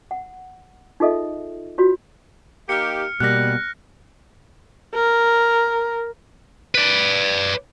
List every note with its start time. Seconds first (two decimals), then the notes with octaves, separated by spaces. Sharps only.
0.11 F#5
1.00 D#4 F4 G#4 A4 D#5 E5
1.78 F4 F#4 C#5 B5
2.69 A#3 D#4 G4 F6 C#7
3.20 B2 G3 A#3 F#6 A#6
4.94 A#4
6.75 B4 D5